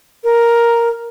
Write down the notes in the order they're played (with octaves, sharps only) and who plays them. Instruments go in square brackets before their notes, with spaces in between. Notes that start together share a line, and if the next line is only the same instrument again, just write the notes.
[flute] A#4